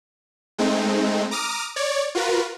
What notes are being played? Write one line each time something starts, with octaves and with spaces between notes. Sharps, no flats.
G#3 A3 C4 D#4
A#5 D6 D#6 F6
C#5 D5
F4 F#4 A#4 B4